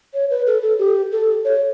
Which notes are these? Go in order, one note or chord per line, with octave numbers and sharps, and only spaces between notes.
C#5
B4
A4
A4
G4
A4
C#5